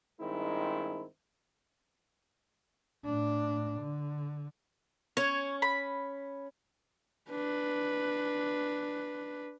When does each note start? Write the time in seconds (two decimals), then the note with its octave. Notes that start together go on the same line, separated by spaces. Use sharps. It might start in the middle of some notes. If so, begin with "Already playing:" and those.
0.20 G2 D#3 G#3 C4 D#4 E4
3.05 A2 D4
3.79 D3
5.17 C#4 C#5
5.62 B5
7.30 D4 B4